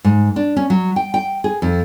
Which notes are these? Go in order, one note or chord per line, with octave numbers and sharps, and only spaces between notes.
G#2
D4
C#4
F#3
G5
G5
G#4
F2